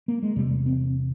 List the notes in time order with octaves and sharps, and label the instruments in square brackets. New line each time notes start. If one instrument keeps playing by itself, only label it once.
[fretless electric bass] A#3
G#3
E2 C3 G3
C4